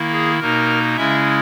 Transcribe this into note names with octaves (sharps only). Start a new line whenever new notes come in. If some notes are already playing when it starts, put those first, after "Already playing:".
Already playing: D#3 A#3 E4
G#4
B2 A#3 D#4 A#4
C#3 G#3 C#4 E4 E5